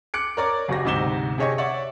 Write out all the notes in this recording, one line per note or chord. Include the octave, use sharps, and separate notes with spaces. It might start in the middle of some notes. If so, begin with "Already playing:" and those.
D6 F#6 C#7 D7
A#4 C#5 D5 A#5 D6
F#1 F#2 F#4 G4 A#6
D2 G#2 C3 D6 E7 G7
C3 G#4 C#5 D#5 C#6
C#5 D5 E5 F#5 C#6